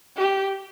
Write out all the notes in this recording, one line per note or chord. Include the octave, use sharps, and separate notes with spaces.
G4